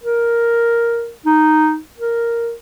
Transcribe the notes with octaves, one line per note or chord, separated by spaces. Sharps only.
A#4
D#4
A#4